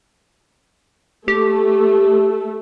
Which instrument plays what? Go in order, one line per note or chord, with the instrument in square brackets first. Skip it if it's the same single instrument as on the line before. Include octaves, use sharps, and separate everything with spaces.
[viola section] A3 [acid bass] G4